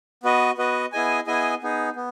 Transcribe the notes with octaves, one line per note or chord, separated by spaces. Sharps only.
B3 F#4 B4 D#5
B3 F#4 B4 D#5
B3 E4 G#4 D#5 G#5
B3 E4 G#4 D#5 G#5
B3 D#4 G#4
B3